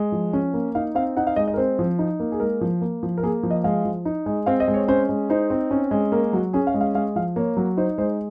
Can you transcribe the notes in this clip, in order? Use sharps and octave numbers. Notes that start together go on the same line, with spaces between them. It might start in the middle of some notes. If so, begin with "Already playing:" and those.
Already playing: G#3
F3
C#4
A#3
D#4 F5
C4 F5
D#4 F#5
F5
G#3 D#5
D#5
A#4
C4 C5
F3
D#4
A#3
G#4
G#3 A#4
F3
A#3
F3
A#4
A#3 G#4
F3
D#5
G#3 F5
F3
D#4
G#3
C4 F5
D#5
G#3
C#5
C#4 C5
G#3
D#4 C5
C4
C#4
G#3
A#3 A#4
F#3 F#4
C#4 G#4
F5
G#3
F5
G#3 F5
F3 F5
A#3 C#5
F#3
D#4 C5
G#3 C5